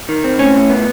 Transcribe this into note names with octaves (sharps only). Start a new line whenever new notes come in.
D#3
C4
A2 C#4
A2
B3